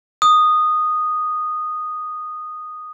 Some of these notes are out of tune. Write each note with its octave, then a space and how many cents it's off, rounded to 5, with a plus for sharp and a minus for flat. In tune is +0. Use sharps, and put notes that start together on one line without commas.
D#6 -10